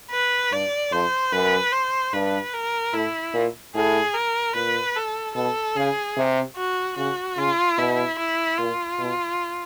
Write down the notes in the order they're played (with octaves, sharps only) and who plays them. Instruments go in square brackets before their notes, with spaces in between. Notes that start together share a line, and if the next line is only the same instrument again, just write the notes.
[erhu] B4
[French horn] G2 [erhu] D5
[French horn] F2 [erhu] C5
[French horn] F#2 [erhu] B4
[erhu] C5
[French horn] G2 [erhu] B4
[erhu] A#4
[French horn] A2 [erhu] E4
[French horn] A#2
[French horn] A2 [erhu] G#4
[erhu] A#4
[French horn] A#2 [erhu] B4
[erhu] A4
[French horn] B2 [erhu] A4
[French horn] C#3 [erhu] G#4
[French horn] C3
[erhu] F#4
[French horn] C#3 [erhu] F#4
[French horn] C#3 [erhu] F4
[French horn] B2 [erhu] E4
[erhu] E4
[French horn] A#2 [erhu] F4
[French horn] B2